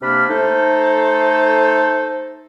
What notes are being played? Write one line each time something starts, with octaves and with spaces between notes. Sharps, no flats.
C3 A#3 D4 B5 F6
A3 D#4 A4 C5